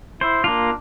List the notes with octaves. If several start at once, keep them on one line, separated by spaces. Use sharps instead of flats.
E4 C5
A#3 D4 F4